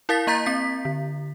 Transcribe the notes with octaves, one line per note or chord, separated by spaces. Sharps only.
E4 A#4 F5 A6 B6
A#3 D#5 A#5 G6 A6 B6
C4 B6
D3